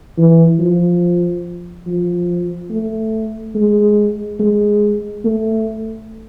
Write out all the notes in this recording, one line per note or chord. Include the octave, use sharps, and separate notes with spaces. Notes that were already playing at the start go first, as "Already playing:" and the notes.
E3
F3
F3
A3
G#3
G#3
A3